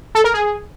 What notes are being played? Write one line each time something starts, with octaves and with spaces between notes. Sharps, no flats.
A4
A#4
G#4